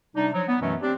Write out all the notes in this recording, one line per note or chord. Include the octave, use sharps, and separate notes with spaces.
C3 G3 D4 D#4
F3 F#3
B3
F#2 B2 E3 F#3 A3 C#4
C4 D4 G4